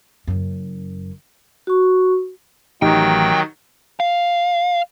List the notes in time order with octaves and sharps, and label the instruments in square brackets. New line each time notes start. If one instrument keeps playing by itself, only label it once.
[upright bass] F#1 F#2
[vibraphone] F#4 C#6
[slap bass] A1 [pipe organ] D#3 F#3 [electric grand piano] D#4 G4 [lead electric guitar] G5
[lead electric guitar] F5